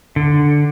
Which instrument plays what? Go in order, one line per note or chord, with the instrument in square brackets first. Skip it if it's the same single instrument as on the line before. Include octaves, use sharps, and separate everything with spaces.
[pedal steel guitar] D3